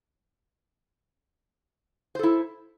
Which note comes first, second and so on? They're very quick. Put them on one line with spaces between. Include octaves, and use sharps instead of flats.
C5 A4 E4